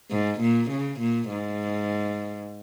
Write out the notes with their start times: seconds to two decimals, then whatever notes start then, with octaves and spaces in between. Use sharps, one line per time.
0.11 G#2
0.41 A#2
0.71 C#3
1.00 A#2
1.30 G#2